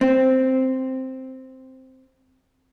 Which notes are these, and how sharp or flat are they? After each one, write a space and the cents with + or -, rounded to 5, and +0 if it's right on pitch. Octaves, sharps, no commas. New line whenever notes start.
C4 +0